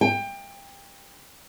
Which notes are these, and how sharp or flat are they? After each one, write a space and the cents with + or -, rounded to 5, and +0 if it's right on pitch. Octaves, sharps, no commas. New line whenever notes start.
G5 +25